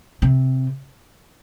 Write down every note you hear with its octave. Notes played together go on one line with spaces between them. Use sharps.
C3